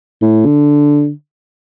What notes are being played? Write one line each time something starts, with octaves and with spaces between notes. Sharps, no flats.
A2
D3